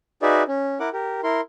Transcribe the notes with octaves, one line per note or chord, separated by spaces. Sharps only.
D#4 F#4 G#4 B4 D5 E5
C#4
E4 A#4 F#5 D6
G4 A#4
E4 A#4 C6